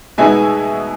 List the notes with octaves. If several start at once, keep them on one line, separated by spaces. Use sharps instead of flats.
B2 G#3 B3 D#4 E5 G#5